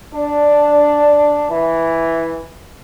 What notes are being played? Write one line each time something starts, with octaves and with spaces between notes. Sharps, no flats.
D4
E3